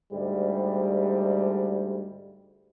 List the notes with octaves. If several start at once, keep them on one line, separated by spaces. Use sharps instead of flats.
D2 G#2 G3